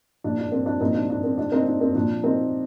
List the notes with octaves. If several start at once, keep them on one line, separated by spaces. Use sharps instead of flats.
A#2 F3 D4
D4
C4
D4
A#2 F3 C4 D#4
D4
D4
C4
C3 G3 D4
C4 D#4
D4
C4
A#2 F3 D4
C4 D#4